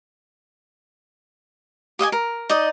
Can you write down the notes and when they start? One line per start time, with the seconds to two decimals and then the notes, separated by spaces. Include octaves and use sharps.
1.99 G4 D#5 F5 G#5
2.12 A#4
2.50 D#4 D5 D#5